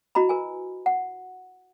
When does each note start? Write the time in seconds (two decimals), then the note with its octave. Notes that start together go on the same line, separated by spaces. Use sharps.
0.15 E4 F#4 D#5 A#5 B5
0.29 A#4 B4 G#5
0.86 F#5